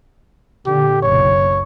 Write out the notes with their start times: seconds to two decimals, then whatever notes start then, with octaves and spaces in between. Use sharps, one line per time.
0.66 A#2 D3 G4
1.03 F#1 B1 C#5